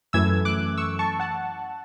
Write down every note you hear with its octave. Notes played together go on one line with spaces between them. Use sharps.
F#2 E3 A3 E6 G#6
D6 F#6
C#6 E6
A5 C#6
F#5 A5